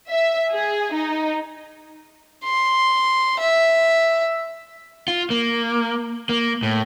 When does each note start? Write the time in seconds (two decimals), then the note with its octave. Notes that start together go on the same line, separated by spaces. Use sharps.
0.11 E5
0.52 G#4
0.94 D#4
2.44 C6
3.39 E5
5.08 F4
5.30 A#3
6.29 A#3
6.63 A2